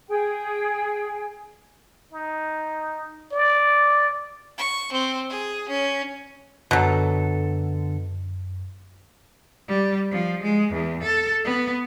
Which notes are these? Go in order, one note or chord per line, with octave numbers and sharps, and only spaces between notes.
G#4 G5
D#4
D5
C#6
C4
G#4
C#4
F#2 B2 D3 F#3 A4
G3
F3
G#3
E2
A4
B3